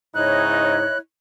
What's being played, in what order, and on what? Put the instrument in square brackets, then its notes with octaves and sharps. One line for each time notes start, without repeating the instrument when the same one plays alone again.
[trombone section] G#2 C#3 D#4 [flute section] E4 C#5 D#5 [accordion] F#6